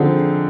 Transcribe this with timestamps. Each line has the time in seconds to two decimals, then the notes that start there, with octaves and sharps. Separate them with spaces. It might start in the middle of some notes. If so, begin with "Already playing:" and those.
Already playing: D3 F3 C4 D#4 G#4